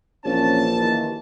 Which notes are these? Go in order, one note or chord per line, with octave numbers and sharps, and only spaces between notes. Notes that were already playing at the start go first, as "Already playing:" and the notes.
A#1 E3 C4 C#4 A5
D#2 E3